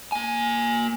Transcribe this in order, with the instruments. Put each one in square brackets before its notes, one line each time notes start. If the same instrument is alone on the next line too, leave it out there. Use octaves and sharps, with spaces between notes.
[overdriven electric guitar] A#3 G#5